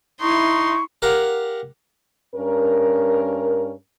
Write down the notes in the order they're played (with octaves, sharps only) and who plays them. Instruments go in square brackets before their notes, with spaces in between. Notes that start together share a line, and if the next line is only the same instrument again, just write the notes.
[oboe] D#4 [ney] E4 [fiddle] C6 [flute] C#6
[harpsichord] G4 A#4 F5 F#5
[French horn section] G2 C#4 A#4